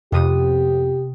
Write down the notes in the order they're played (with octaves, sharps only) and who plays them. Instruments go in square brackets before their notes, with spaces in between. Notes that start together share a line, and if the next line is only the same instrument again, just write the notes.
[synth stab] F2 [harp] C3 B3 D#6 [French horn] G4